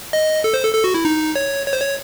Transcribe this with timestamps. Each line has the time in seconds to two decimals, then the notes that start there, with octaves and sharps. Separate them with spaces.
0.13 D#5
0.44 A4
0.54 C5
0.63 A4
0.74 A4
0.84 F#4
0.94 E4
1.05 D#4
1.35 C#5
1.66 C#5
1.73 C5
1.80 C#5